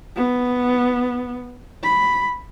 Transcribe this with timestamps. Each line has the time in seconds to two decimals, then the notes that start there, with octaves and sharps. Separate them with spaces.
0.16 B3
1.83 B5